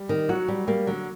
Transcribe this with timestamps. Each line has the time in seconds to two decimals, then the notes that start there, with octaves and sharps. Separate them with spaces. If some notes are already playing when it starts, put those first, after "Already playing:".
Already playing: G3
0.09 D#3
0.29 F#3 F#4
0.48 G3
0.67 G3 A#3
0.87 D3 F#3